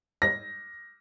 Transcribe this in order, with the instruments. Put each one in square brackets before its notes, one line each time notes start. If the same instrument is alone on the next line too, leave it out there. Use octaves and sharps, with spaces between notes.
[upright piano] A#6